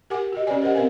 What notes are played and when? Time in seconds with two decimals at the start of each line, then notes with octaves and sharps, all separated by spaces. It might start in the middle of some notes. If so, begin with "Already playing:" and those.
0.10 G4 A#4 F#5 G#5 D6
0.32 F#4 G4 D#5
0.47 C#4 G4 B4 C#5 D5 G#5
0.62 G4 A#4 C5 D#5 F#5
0.75 C4 A#4 B4 F5 G#5